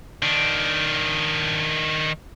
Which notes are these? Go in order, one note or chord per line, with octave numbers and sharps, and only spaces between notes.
D#3 D4